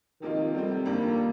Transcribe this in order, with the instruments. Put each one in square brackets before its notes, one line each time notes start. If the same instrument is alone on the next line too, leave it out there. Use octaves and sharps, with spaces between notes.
[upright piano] C3 F3 A#3 F4 [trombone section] D#3
[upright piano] C3 F3 A3 C4 [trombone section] G3
[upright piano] F2 C3 D#3 G3 D4 [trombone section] A#3